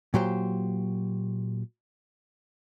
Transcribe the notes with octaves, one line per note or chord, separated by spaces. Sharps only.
A#2 F#3 G4 C5